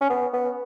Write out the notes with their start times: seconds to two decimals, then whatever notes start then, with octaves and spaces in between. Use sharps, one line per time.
0.01 C#4
0.10 B3
0.33 B3